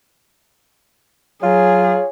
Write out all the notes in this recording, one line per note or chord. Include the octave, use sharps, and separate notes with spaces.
F#3 F4 G#4 C#5